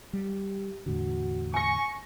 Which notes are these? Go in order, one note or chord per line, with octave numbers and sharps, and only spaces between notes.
G3 G4
E2 A2 D3 F#4
G#5 C#6 A#6